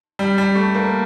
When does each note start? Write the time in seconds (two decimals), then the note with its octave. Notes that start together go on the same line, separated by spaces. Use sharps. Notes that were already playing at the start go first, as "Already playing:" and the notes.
0.19 G3
0.38 G3
0.55 A3
0.75 A#3